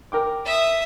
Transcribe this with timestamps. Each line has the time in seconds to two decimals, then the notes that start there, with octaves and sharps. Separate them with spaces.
0.12 A#4 G5 D6
0.45 E5 D#6